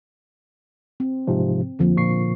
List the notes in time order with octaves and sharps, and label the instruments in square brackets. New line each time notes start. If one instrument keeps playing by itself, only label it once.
[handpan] C4
[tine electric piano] G#2 C3 F3
[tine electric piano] F2 [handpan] D3 F3 A#3
[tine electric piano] A#2 C#6 C7